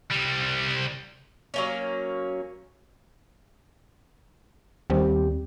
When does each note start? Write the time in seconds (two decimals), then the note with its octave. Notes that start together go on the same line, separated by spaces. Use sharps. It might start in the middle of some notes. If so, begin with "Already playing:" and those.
0.11 C2 G3
1.54 F#3 A#3 C#4
4.90 D#2 G3 C4 G4